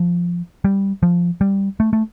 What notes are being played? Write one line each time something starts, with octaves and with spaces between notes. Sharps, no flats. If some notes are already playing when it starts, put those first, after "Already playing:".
Already playing: F3
G3
F3
G3
A3
A3